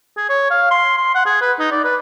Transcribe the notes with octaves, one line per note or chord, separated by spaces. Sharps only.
G#4
C#5
F5
C6
C6
F#5
G#4
B4
D#4
D5
B4